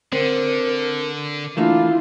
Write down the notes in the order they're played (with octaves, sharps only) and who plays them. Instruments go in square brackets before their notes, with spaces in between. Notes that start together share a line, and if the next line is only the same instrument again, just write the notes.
[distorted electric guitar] D3 [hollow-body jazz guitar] C4 [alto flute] A#4
[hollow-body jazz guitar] E3 A3 A#3 [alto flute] D4 [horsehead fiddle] E4 F4